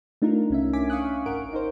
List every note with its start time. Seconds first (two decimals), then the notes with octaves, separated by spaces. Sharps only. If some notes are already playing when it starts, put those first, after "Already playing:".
0.22 A3 D4 D#4 F4 A#4
0.50 C2 C#4 E5
0.73 C#4 D4 G#5 D6 B6
0.90 F5 C#6 D#6 F#6
1.26 G#1 A#4 F#5 D7
1.53 D#4 A#4 C5